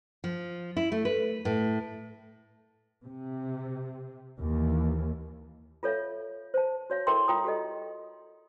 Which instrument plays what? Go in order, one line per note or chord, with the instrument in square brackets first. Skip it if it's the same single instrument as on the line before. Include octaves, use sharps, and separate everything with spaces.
[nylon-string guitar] F3
E4
A3
B4
A2
[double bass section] C3
D#2 E3
[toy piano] F4 A4 C#5 E5 F5
C5 A5
F#4 C#5 F5
E4 A4 A#4 E5 G5 C6
F4 G5 A#5 D#6
F#4 G4 A4 D#5